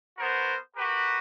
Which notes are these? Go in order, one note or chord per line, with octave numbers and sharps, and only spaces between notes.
B3 F#4 A#4 C5
F#4 G4 A#4 B4